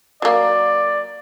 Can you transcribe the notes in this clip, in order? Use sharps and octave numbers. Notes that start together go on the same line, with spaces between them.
F#3 A#3 D5